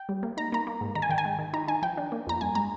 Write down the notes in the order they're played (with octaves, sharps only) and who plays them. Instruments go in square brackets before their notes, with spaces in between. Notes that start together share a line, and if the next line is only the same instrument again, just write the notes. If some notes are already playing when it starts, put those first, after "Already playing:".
Already playing: [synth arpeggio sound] G5
G3
A#3
D#4 A#5
A#3 A#5
A#3
G#2
D#3 A#5
G#5
D#3 G5
G#5
G#3
D#3
D#4 A#5
D#3 G#5
F3 G5
D4
A#3
F2 A#5
G2 G#5
G#3 A#5